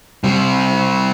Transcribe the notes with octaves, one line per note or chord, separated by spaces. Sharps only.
C3 G3